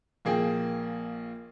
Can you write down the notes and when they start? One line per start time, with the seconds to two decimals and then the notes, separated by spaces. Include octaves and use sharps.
0.25 A#1 A#3 G#4 G5